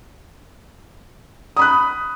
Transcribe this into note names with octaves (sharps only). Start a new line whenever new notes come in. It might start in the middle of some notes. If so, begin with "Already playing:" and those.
B5 D#6 F#6